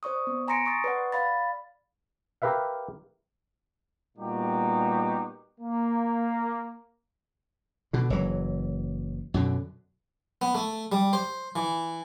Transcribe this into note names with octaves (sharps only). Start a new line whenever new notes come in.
C5 D5 C#6 D#6
B3
G#5 A#5 C6 A#6 C#7 D7
C6 C#6 D#6 A6
B4 D5 F#5
D5 F5 B5 A6
G4 A#4 B4 E5 F5
A#2 G3 B3 D#4 F#4 G4
A#3
B2 D3
F#1 E3 F#3
F#2 B2 D3
B3
A3
G3
C5
E3